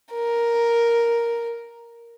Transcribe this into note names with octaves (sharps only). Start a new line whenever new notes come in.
A#4